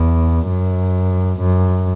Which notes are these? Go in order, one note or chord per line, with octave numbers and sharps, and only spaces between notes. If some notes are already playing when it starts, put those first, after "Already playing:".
Already playing: E2
F#2
F#2